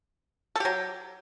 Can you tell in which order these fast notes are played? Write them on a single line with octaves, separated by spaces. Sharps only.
A4 G4 F#3